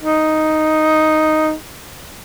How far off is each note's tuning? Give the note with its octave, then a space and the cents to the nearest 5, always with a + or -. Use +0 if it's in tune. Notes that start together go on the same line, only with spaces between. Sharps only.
D#4 +0